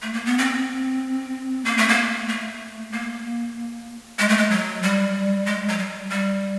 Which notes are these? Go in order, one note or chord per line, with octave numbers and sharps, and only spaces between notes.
A3
A#3
B3
C4
A#3
A3
A#3
A3
A#3
G#3
A3
G#3
F#3
G3
G#3
F#3
G3
G3